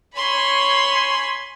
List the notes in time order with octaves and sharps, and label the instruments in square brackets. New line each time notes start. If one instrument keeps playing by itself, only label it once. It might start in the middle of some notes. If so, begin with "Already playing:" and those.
[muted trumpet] C#5 [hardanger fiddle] G#5 B5 [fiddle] C6